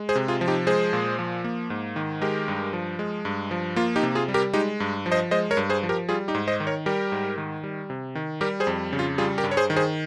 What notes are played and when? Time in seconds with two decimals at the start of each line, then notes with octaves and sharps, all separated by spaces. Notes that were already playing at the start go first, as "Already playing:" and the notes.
Already playing: G#3
0.09 G#4 C5
0.15 C3
0.28 F4 G#4
0.41 F3
0.48 D#4 G4
0.67 G#3 G#4 C5
0.93 A#2
1.19 F3
1.44 A#3
1.70 G#2
1.96 D#3
2.21 G#3 G4 A#4
2.48 G2
2.73 F3
2.99 G#3
3.25 G2
3.51 F3
3.76 A#3 F4
3.96 D#4 G4
4.03 C3
4.15 F4 G#4
4.28 G3
4.34 G4 A#4
4.53 G#3 D#4 G4
4.80 G2
5.06 F3
5.12 C5 D#5
5.31 G#3 C5 D#5
5.51 A#4 C#5
5.57 G2
5.69 G#4 C5
5.83 F3
5.89 G4 A#4
6.09 G3 F4 G#4
6.28 D#4 G4
6.35 G#2
6.48 C5 D#5
6.60 D#3
6.67 A#4 C#5
6.86 G3 G4 A#4
7.12 G#2
7.38 D#3
7.63 G3
7.90 C3
8.15 D#3
8.41 G3 G4 A#4
8.60 G#4 C5
8.67 F2
8.93 C#3
8.99 F4
9.18 G3 F4 G#4
9.38 G4 A#4
9.44 G2
9.51 C#5
9.57 G#4 C5
9.70 D#3
9.76 G#4 C5